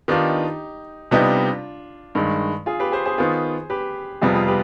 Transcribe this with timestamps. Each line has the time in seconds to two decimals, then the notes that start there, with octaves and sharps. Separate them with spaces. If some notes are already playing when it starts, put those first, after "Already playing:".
0.08 D#3 B3 D4 D#4 F4 G4
1.11 C3 G3 B3 D4 D#4 F4 G4
2.15 G2 D#3 G#3
2.66 F4 G#4
2.80 G4 B4
2.92 G#4 C5
3.05 G#4 C5
3.18 D#3 B3 F4 G#4 C5
3.70 G4 B4
4.22 F2 C3 G3 B3 F4 G#4
4.34 F4 G#4
4.48 G4 B4